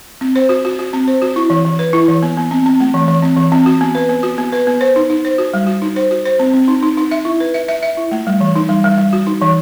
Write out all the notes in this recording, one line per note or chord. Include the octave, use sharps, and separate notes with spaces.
C4
C5
F#4
F#4
F#4
C4
C5
F#4
E4
E3
E3
B4
E4
E3
B3
B3
C4
C4
A3
E3
E3
C4
E3
C4
F#4
B3
B4
B3
F#4
B3
B4
B3
C5
D#4
D#4
C5
F#4
G3
F#4
D#4
C5
F#4
C5
C4
C4
D#4
D#4
D#4
E5
E4
B4
E5
E5
E5
E4
A3
G3
E3
D#4
G3
G3
G3
F#4
D#4
E3